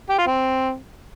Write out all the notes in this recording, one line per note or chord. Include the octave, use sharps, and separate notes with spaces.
G4
F4
C4